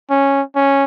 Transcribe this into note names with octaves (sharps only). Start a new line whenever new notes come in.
C#4
C#4